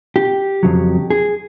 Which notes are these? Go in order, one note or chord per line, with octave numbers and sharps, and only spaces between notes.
G4
F2 C#3 F#3
G#4